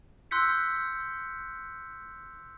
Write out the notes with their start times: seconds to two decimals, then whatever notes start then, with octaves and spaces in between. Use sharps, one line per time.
0.31 C6 E6 F#6 G6 B6 C#7